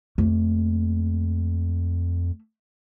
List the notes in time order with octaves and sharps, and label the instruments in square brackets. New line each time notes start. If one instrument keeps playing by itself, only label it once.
[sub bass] F2 [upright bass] A3 A#3